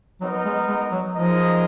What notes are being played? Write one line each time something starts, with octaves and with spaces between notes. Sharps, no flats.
F#3 B3 D#4 A#4 D#5
G#3
G#3
F#3
F3 G#3 D#4 A#4 D#5